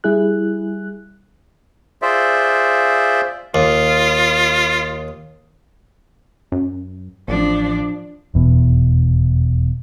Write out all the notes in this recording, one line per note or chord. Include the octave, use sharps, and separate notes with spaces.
G3 E4 G#4 F#6
F4 G#4 C5 D5 E5
D#2 F4
F#2
A1 F3 D4
F1 E2 B2